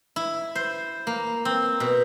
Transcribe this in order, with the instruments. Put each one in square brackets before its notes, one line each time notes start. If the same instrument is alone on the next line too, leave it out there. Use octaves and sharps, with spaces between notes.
[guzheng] E4
C5
A#3
C4
B2